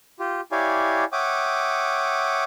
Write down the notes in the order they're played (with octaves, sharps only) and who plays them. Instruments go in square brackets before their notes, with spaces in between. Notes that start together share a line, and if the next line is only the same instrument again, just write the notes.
[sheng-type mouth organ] F4 G4
E4 G4 C#5 D5 F5 G#5
C#5 E5 F#5 G5 D6 D#6